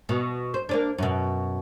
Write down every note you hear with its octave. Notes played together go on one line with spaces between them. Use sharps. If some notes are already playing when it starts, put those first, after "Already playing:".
B2
C5
A#3 C#4 D4
F#2 B2